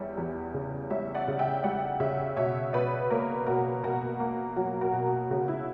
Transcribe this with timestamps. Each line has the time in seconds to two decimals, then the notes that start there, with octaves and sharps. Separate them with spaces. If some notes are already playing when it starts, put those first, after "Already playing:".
Already playing: E2 G3 C#5 E5
0.17 E2
0.54 C#3
0.90 G3 C#5 E5
1.15 D5 F#5
1.28 C#3
1.39 E5 G5
1.64 G3 D5 F#5
2.00 C#3 C#5 E5
2.37 B2 C#5 E5
2.73 B2 B4 D5
3.10 A#3 A#4 C#5
3.46 B2 F#4 A#4
3.83 B2 F#4 A#4
4.20 A#3
4.56 F#3 F#4
4.81 F#4 A#4
4.93 B2
5.06 F#4
5.30 C#3 F#4
5.48 E4